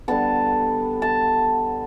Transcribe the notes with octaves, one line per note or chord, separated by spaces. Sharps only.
D3 G3 B3 A5
A5